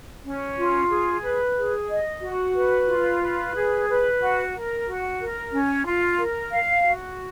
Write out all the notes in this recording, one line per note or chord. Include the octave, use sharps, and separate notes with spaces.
C#4
F4
G#4
B4
G#4
D#5
F#4
B4
F4
B4
G#4
B4
F#4
A#4
F#4
A#4
C#4
F4
A#4
F5
F#4